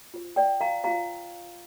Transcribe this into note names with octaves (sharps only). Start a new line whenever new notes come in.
F4 C5
D5 G5
F5 A#5
F4 C5 F5 A#5